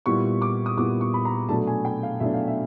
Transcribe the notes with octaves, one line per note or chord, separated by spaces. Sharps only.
A#2 G3 B3 E4 C#6
D6
D#6
A#2 G3 B3 E4 D6
C#6
B5
A#5
B2 F#3 A3 D4 A5
G#5
G5
F5
B2 F#3 A3 D4 E5
F5
E5